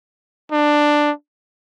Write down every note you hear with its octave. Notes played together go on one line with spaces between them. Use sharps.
D4